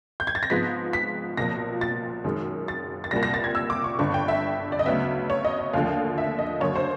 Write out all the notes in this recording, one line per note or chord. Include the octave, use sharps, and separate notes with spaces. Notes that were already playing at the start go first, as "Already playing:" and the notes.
G6
G#6
A6
A#6
G#2 F3 G#3 B3 B6
B6
B1 A#2 F3 A#6
A6
F#2 D#3 G#3
A6
A6
C2 A#2 G3 A#6
A#6
A6
G#6
E6
D6
C#6
G1 G2 D3 C#6
G5
E5
D5
D#5
D2 C#3 F#3 B3 E5
C#5
D#5
D#5
D#2 D3 F3 A3 F5
E5
D#5
F#2 D3 F#3 A#3 C#5
C5